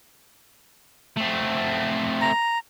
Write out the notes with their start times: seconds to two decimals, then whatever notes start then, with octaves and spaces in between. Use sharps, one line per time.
1.17 A3 C4
2.21 A#5